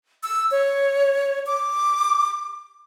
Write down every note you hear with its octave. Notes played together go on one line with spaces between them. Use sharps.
E6
C#5
D6